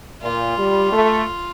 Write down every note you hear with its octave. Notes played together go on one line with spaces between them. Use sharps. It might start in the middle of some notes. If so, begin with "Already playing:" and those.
A#2 F4
G3
A3